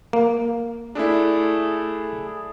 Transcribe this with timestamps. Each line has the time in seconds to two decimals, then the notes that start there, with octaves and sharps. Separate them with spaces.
0.13 A#3
0.95 A3 D4 E4 G#4